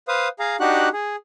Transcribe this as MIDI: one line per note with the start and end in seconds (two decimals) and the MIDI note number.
0.08 0.28 71
0.08 0.28 72
0.08 0.28 77
0.08 0.28 87
0.39 0.56 68
0.39 0.56 77
0.39 0.56 82
0.60 0.89 62
0.60 0.89 63
0.60 0.89 66
0.60 0.89 67
0.60 0.89 78
0.60 0.89 90
0.93 1.16 68